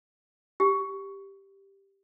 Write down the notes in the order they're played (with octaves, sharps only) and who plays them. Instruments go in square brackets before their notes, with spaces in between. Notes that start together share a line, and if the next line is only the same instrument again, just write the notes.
[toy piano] G4